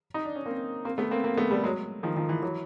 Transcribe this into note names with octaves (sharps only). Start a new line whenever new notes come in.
D#4
D4
C#4
A#3 C4
A#3 C4
A3 B3
A#3 C4
A#3 C4
A3 B3
G3 A3
F#3 G#3
D#3 F3
D#3 F3
E3
E3 F#3